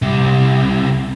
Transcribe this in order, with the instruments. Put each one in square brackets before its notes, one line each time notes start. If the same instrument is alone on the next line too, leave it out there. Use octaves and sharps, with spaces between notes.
[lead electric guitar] C2 C3